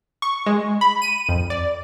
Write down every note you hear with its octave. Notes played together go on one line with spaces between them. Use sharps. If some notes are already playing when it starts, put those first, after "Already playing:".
C#6
G#3
B5
D#7
F2
D5